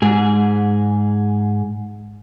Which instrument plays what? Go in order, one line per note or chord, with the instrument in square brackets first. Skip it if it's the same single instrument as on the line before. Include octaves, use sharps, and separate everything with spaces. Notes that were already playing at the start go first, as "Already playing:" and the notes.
[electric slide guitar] G#2 G#4